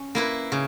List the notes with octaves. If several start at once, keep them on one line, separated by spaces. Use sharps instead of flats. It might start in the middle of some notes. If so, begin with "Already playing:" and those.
Already playing: C#4
A#3 E4 B4
C#3